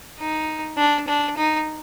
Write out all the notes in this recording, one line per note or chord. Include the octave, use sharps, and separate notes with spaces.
D#4
D4
D4
D#4